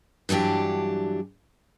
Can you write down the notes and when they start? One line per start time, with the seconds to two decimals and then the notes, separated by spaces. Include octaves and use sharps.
0.29 G2 E3 F#3 D4 G4